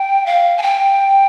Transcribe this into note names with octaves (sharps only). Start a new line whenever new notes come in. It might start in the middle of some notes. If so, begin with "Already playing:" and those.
Already playing: G5
F5
G#5
G5